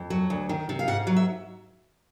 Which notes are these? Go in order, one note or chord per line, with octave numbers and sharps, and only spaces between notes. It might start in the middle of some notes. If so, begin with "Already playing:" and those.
Already playing: F2
F#3
D2
D#3
C3
F5
G#2 F#5
F#3
E5